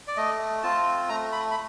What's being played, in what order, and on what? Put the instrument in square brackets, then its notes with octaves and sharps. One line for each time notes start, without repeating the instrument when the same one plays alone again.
[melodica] D5
A3 D#5
C4 F4 A5
A3 A#5
B5
B5